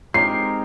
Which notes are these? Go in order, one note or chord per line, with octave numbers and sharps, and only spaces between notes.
G#3 C4 D#4 G4 A#4 C7